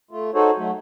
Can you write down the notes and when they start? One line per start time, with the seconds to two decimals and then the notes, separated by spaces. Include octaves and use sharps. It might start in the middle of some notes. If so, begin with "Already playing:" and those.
0.11 A3 F4
0.34 D#4 F#4 G#4 A4 C5 C#5
0.57 F#3 A3